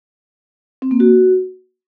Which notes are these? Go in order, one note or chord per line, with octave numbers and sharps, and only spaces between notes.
C4
A#3
F#4